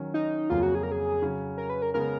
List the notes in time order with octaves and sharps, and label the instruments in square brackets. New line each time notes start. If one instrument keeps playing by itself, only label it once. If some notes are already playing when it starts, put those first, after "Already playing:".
Already playing: [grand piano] D#3 F#3 C#4
[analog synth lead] D#4
[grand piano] F2 C#3 F#3 A#3 C#4 [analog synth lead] F4
[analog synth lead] F#4
G#4
A#4
G#4
[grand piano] C#3 F#3 C#4
[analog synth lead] A#4
B4
A#4
[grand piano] C#3 G#3 B3 [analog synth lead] A#4